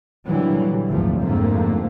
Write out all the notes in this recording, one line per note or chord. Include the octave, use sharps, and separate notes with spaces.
A#2 D3 E3 F#3 G3
G#1 D2 F3 A3
F2 G#2 D3 A3 A#3